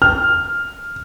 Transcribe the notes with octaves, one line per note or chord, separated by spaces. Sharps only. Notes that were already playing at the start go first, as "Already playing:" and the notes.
F6